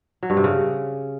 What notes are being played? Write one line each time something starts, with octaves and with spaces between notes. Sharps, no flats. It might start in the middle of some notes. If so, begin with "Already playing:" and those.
F#3
G2
C3
C#3